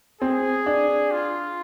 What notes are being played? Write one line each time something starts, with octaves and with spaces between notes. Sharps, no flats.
C4 G#4
D4
F4